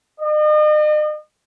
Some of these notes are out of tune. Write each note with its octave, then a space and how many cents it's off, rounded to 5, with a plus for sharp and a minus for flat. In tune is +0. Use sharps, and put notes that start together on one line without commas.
D#5 -40